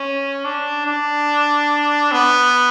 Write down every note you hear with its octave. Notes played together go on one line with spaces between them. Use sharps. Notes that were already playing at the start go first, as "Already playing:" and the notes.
Already playing: C#4
D4
D4
B3